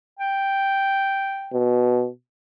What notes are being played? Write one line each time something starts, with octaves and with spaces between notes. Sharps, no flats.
G5
B2